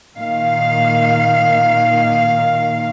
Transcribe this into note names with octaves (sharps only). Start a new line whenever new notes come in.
A#2 D#3 F5